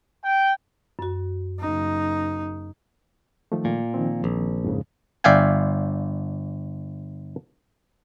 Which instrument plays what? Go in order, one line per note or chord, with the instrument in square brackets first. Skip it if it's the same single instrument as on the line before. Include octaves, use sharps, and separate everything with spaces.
[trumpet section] G5
[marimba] F#2 F#4
[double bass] F#1 D#4
[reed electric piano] D#3 F3 A3
[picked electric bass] A#2
[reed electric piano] D#3 F3 C4
[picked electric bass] A#1
[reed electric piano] F2 G#2 C#3
[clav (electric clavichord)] G1 D5 E5 F5 G5 G#5